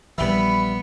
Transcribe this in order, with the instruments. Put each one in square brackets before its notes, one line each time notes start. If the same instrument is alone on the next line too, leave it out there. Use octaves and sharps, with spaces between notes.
[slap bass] A#1 E3 [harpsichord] G3 E4 E5 [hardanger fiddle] B3 [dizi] B5